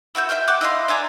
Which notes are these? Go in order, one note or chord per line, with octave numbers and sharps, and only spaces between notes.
E4 F#4 E5 G6
E5 G5 F6 G6
G4 F#5 D6 F#6
E4 D#5 F5 C6
D4 E5 G#5 A#5